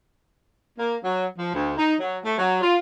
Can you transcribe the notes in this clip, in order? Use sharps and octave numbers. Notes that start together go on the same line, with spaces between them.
A#3
F#3
F3
D2
D#4
F#3
A3
F#3
F4